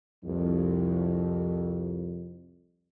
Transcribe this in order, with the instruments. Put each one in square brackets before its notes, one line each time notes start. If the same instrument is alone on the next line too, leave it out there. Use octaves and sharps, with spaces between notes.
[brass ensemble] C2 F2